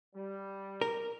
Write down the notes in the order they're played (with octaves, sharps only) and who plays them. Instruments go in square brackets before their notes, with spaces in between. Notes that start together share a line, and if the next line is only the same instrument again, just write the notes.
[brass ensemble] G3
[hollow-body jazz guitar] A#4